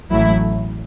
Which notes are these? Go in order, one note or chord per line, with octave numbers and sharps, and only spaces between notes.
A1 A2 F#3 A3 E4